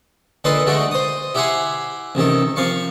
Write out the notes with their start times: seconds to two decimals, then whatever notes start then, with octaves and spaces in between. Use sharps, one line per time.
0.44 A#2 D3 A4 B4 D#5 C6
0.66 D3 G#3 A3 D4 F#4
0.91 C5 D#6
1.34 E4 G4 E5 F#5 G#5 C6
2.15 A1 C3 D#3 A4
2.56 C3 F3 F5 C#6